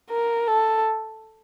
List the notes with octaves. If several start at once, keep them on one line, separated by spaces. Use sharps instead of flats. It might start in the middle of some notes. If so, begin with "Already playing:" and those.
A#4
A4